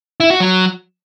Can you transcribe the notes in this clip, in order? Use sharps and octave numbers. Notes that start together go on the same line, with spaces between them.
E4
F#4
F#3